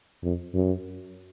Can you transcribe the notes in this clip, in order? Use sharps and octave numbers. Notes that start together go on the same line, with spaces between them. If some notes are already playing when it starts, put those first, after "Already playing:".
F2
F#2